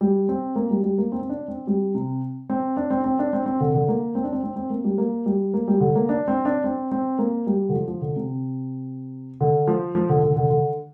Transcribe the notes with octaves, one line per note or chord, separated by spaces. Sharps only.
G3
C4
A#3
G3
G3
A#3
C4
C4
D4
C4
G3
C3
C4
D4
C4
C4
D4
C4
C4
D3
D3
A#3
C4
D4
C4
C4
C4
A#3
G3
A#3
G3
A#3
G3
D3
A#3
D4
C4
D4
C4
C4
A#3
G3
D3
F3
F3
D3
C3
D3
F3
F3
D3
D3
D3
D3